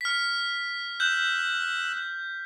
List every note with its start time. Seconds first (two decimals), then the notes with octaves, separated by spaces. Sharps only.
0.01 F6 B6
1.00 E6 F#6 G6